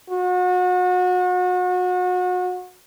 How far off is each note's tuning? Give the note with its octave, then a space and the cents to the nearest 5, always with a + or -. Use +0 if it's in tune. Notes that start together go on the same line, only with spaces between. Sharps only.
F#4 -35